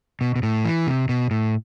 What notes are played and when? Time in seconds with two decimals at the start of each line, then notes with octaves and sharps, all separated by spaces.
0.21 B2
0.36 B2
0.43 A2
0.65 E3
0.87 C3
1.09 B2
1.31 A2